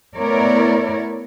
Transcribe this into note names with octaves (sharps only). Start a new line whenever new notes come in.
A3 B3 E4 A#4 C#5 D5